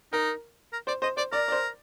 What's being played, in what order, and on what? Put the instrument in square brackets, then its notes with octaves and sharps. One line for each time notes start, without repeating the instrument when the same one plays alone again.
[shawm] D#4 [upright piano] A#4
[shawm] A#4
[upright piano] C5 [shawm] D5
[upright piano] C5 [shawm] D#5
[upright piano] C5 [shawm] D5
[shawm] A#4 [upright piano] D5
[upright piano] D5
C5